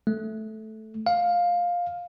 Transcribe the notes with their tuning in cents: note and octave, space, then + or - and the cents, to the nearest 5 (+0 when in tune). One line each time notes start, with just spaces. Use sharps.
A3 -10
F5 +10